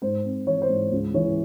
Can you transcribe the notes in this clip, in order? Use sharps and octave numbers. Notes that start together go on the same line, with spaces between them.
G#2 C5
C4
E3 C#5
C5
G#2
C#2
E3 C#5